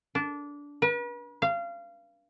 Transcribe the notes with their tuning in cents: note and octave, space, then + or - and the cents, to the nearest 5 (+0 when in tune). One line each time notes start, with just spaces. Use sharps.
D4 -20
B4 -40
F5 -25